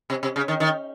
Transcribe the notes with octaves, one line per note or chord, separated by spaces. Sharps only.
C3
C3
C#3
D#3
D#3